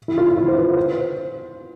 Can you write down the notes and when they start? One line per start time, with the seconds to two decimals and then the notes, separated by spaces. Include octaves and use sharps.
0.08 E4
0.18 F4
0.28 E4
0.37 F4
0.48 C5
0.57 B4
0.77 C5